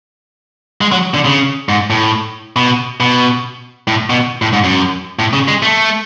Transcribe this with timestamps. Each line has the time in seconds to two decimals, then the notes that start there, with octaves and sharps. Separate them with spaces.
0.81 G#3
0.92 F#3
1.14 D3
1.25 C#3
1.69 G#2
1.90 A2
2.56 B2
3.00 B2
3.87 A2
4.10 B2
4.42 A2
4.53 G#2
4.64 F#2
5.19 A2
5.33 C#3
5.48 G#3
5.63 A3